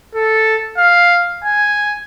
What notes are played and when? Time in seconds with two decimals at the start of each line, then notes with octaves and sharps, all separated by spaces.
0.15 A4
0.77 F5
1.44 G#5